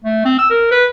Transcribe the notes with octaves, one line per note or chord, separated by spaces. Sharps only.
A3
C4
E6
A#4
B4